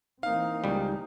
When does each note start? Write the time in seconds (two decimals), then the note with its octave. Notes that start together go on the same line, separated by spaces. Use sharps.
0.23 E3 A#3 C4 D#4 F5
0.64 C#2 G3